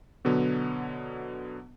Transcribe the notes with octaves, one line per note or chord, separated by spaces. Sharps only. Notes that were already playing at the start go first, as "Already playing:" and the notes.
B2 D3 F#3 B3